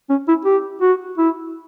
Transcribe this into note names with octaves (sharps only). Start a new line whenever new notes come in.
C#4
E4
G4
F#4
E4